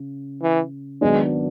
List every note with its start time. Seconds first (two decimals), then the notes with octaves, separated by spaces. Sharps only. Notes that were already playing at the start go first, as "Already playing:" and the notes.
Already playing: C#3
0.42 E3
1.01 G#1 G#2 F#3 G#3 B3 D4